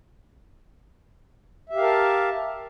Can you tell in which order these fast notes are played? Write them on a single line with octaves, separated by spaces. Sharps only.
E5 G4 F5 A#4 A5